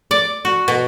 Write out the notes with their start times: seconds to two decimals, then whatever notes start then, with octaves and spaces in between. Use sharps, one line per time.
0.11 D5
0.45 F#4
0.68 B2